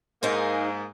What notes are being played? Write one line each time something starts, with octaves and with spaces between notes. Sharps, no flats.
G#2 A#3 D#4 G#4 C5